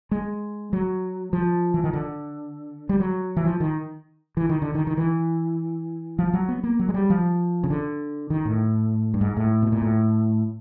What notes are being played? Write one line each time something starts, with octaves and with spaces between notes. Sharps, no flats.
G#3
F#3
F3
E3
D#3
D3
G3
F#3
E3
F3
D#3
E3
D#3
D3
D#3
D#3
E3
F3
F#3
B3
A#3
F#3
G#3
G3
F3
C#3
D3
D#3
A2
G2
G#2
A2
B2
A#2
A2